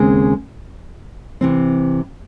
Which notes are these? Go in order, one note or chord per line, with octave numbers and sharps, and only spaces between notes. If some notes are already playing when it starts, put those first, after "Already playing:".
Already playing: D#2 C#3 G#3 C4
C3 E3 C4